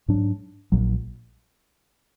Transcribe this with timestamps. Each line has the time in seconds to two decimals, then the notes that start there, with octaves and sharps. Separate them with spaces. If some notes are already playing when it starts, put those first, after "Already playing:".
0.08 G#2 F#3 D4
0.72 A#1 A#2 F#3